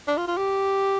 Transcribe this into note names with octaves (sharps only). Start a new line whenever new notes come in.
D4
F4
F4
G4